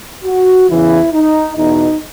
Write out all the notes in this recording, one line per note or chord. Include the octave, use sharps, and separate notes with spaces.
F#4
E2 C#3 E3 E4
D#4
E2 B2 D#4